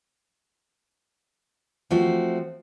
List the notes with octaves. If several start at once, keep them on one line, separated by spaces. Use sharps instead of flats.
F3 A3 C4 F#4